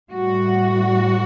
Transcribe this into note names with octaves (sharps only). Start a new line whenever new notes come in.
A2 G3 F#4